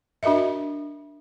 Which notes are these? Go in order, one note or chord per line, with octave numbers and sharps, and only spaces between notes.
D4 F#4 A#4 D#5 E5